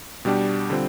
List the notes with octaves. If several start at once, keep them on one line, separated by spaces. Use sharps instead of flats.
B2 G3 D4 G4
D3 G3 C4 F4